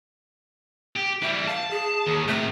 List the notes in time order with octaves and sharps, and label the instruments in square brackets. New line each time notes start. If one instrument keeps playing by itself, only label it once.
[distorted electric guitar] G4
[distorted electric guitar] E3 G3 [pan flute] E5
[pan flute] F5 [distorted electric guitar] A5
[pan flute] G#4
[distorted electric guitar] D#2
[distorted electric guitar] A2 C3 [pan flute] A3